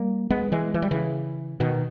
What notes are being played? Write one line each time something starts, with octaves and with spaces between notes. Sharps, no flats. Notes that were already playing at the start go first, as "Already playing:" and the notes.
Already playing: G3 A#3
G#3 B3
E3 G#3
E3
G3
C#3 E3
B2 D#3